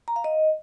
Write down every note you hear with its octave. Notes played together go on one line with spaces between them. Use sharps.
A#5
F5
D#5